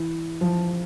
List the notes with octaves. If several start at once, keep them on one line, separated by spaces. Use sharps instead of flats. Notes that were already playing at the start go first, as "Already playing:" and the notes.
Already playing: E3
F3